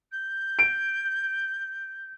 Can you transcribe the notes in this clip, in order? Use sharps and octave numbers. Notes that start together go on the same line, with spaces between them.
G6
D7